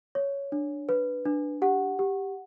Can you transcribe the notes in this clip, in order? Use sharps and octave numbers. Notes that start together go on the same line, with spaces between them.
C#5
D4
B4
D4
G4 F#5
G4